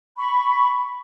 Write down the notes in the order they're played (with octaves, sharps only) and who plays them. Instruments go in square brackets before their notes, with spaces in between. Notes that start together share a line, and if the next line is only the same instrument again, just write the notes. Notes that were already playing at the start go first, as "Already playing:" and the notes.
[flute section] B5 C#6